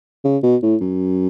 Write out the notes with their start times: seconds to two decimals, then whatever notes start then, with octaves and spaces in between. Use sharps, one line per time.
0.25 C#3
0.43 B2
0.63 A2
0.81 F#2